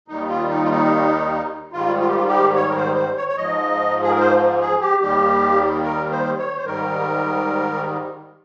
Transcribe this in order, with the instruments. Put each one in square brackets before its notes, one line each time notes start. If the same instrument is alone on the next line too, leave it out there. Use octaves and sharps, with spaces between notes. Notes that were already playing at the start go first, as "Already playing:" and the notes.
[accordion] D#2 D#3 G3 D#4
F4
D#4
F4
D#4
G#2 D#3 G3 F4
F4
G4
F4
G4
C#5
A#4
C5
C5
C#5
C#5
G#2 F3 D#5
G#4
A#4
C5
G#4
G4
D#2 D#3 G3 G4
A#4
C5
C#5
C5
G#2 D#3 G3 A#4